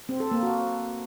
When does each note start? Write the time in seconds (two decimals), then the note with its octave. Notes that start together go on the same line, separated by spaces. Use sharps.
0.09 C4
0.20 A4
0.31 A#3
0.43 F#4